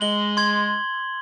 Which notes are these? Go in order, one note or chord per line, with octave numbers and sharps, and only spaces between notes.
G#3 F#7 G7
C6 G#6